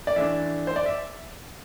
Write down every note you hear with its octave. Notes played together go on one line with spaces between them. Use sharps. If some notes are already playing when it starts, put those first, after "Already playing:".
D5
E3 A3 D4 E5
C5
D5
E5